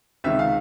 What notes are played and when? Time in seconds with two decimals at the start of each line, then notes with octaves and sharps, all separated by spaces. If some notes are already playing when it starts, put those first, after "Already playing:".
0.24 C#2 C3 D#3 E5
0.39 F5